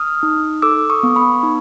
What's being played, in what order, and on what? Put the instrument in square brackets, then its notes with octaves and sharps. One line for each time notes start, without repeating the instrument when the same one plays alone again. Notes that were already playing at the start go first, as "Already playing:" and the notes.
Already playing: [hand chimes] D#6 F6
D#4
A4 D6 E6
C#6 D#6
B3
B5 C#6
D#4